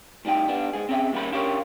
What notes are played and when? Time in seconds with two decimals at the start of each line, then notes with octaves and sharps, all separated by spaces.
0.25 A2 G3 D#4 G5
0.48 G3 B3 D4
0.73 G#2 G#4
0.89 C4 C#4 G#4 A#4 E5 G5
1.12 D#2 A#2 G3 A#3 C#4 B5
1.32 C#4 D4 F4 G4 A#4 C#5